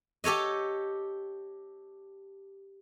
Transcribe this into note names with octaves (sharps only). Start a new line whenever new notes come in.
G4 A4 C#5 D#5